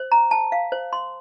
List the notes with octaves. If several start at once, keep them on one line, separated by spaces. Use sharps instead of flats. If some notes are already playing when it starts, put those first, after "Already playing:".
Already playing: C5
A#5
A5
F5
C5
C6